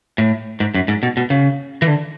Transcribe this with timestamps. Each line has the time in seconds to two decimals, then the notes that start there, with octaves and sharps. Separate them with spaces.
0.18 A2
0.60 G#2
0.74 F#2
0.88 G#2
1.03 B2
1.17 B2
1.30 C#3
1.82 E3
1.87 D3